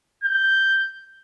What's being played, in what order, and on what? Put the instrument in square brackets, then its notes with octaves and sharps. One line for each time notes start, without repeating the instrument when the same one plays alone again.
[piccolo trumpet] G6